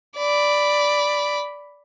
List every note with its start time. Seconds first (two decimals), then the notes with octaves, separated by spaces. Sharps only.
0.17 D5 B5